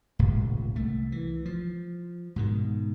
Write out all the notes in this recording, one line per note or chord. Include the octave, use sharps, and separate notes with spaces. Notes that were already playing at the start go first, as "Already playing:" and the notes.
D1 G#1 C#2 A#2
C2 A3
E3
F3
G#2 B2 D#3